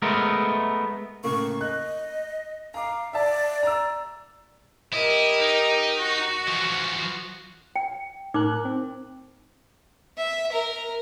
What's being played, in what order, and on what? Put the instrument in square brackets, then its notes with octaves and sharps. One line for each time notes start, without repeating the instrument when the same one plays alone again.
[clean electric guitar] G#3 A3 B3 A#4
[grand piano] A2 C#3 A#3 [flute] C#6
[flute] D#5 [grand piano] F#6
[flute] F5 [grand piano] A#5 D6
[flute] D5 [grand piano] E5 A5
[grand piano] A#5 E6
[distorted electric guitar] E4 [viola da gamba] G4 A#4 D#5
[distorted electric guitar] D#4
[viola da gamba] F#4
[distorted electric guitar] E3 F3
[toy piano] G5
[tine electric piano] A2 A#4 F#6 [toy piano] D#4 D6
[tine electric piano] C4
[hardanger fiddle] E5
A#4